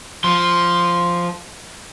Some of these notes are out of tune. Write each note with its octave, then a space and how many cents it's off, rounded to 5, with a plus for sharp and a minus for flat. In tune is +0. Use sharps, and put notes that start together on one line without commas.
F3 +0 C6 +0